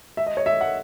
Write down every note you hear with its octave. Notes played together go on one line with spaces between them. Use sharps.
E5
D#5
C#5
E5
F#5